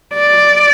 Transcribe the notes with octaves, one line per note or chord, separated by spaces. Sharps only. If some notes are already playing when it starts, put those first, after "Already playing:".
D5